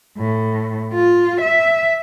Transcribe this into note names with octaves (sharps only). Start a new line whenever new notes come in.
A2
F4
E5